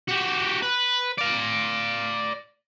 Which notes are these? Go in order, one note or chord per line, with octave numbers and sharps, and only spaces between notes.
F#4 G4
B4
D5 F5